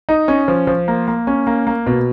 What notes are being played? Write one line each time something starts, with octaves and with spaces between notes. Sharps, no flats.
D#4
C#4
F3
F3
A#3
A#3
C#4
A#3
A#3
B2